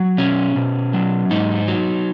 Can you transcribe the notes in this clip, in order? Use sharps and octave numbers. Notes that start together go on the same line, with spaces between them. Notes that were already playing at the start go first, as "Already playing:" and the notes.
Already playing: F#3
B2 C#4
B2
F#3
G#2 D#4
F#3